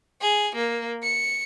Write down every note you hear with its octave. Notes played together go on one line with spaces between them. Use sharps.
G#4
A#3
C#7